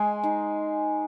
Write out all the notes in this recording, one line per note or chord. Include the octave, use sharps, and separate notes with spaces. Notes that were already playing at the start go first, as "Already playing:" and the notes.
Already playing: G#3 G#5
D#4